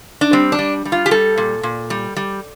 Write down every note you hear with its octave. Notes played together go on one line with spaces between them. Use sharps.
D4
G3 C4
D4
G3
G3
F4
G4
G3 A4
A#2
A#2
G3
G3